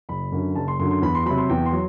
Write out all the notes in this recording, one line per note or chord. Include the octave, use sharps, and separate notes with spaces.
F#1 B5
F#2 D3 F#3
F#1 A5
C6
F#2 D3 F#3 C6
C6
E2 B5
C6
C3 F#3 B5
C6
E2 G5
C6
F#3